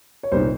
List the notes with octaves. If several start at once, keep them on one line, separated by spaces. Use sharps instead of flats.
C#5
C2 A#2 G3 B3 D#4 C5